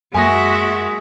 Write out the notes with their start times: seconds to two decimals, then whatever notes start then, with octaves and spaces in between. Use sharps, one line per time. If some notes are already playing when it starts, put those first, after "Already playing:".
0.14 F#2 G#3 A#3 F#4 E5 G#5 D#6 A#6